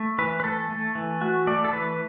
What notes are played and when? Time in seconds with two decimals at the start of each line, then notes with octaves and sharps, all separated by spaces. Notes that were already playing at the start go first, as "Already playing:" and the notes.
Already playing: A3
0.18 E3 B4
0.40 B4
0.44 A3 A4
0.70 A3
0.95 E3
1.21 A3 F#4
1.47 A3 D5
1.64 A4
1.73 E3 B4